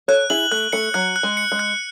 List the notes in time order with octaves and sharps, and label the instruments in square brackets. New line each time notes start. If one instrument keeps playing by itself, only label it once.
[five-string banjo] A4 C#5 [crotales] F#6
[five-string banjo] E4 G#4 [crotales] F#7
[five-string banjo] A3 [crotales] F#6
[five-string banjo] A3 [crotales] C#7
[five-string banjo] F#3 [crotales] F#6
[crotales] F#6
[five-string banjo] G#3
[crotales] C#7
[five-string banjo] G#3
[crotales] F#6